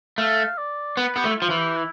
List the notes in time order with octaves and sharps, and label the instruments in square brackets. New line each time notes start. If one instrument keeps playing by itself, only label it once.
[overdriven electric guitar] A3 [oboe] F5
[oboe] D5
[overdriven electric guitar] B3 [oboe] B4
[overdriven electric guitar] B3 [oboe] G4
[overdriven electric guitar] A3
[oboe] E4
[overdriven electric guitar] F3 [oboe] F4
[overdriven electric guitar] E3
[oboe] G4
E4